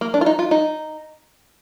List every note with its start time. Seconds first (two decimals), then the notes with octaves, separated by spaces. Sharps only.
0.01 A#3
0.14 D4
0.21 F4
0.26 D#4
0.39 F4
0.51 D#4